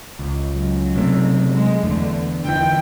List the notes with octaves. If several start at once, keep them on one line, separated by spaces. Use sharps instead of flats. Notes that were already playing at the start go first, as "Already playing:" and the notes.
C#2
C#3 F#3
C3 A3
F#3 G#3
E2 D3 A3
D3 E3 G5